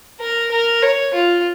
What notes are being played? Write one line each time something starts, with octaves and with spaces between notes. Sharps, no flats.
A#4
A#4
C#5
F4